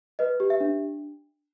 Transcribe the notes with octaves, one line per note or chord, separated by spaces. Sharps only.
B4 D#5
G4
E5
D4